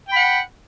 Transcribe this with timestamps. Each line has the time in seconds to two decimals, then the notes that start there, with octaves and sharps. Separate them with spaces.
0.08 G5
0.12 B5
0.16 F#5